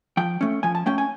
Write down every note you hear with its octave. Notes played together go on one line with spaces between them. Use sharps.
F3 G5
A3 C#4
F3 G#5
A5
A3 C#4 G5
G#5